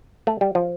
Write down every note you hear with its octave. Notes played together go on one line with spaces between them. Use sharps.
A3
G3
F3